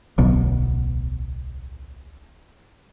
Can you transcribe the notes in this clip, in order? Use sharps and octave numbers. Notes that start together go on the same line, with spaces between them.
D1 B1 B2